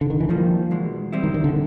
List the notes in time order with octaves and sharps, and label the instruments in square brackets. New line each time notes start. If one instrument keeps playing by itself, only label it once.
[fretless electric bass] D3
D#3
E3
[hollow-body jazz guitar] D#3 G3 A#3 [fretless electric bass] F3
[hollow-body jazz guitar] E2 B2 G#3
G3 C4 E4
[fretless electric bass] D#3
D#3
D3